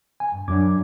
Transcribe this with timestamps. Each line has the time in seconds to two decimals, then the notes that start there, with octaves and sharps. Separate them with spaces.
0.20 G#5
0.32 G2
0.48 F#2 D4 D6 G#6